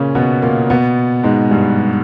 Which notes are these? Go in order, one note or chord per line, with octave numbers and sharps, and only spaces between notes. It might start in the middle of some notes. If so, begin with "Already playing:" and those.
Already playing: A#2 C#3 A#3 C#4
B2 B3
A#2 A#3
B2 B3
G#2 G#3
G2 G3